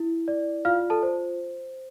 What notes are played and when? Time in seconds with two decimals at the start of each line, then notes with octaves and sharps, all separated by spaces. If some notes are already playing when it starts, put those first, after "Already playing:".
Already playing: E4
0.28 D5
0.65 F4 F5 F6
0.90 A4 A5
1.03 C5